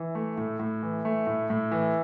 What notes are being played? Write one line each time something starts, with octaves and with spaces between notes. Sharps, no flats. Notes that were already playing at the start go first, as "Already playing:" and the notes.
Already playing: E3
A3
A2
A2
E3
A3
A2
A2
E3